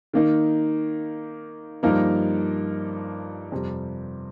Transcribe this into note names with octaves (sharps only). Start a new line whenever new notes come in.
D#3 A#3 D#4
G2 F3 A#3 D#4 A#4
F2 C3 G3